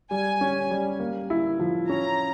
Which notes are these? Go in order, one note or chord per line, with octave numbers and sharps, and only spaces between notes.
G3 G#5
C#4
G3
A#3
E4
F3
C#4 A#5